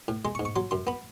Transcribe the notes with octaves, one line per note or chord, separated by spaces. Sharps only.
A2
G#3 C6
C#6
G#2
C#6
F#3 C6
F#2 C6
B3 B5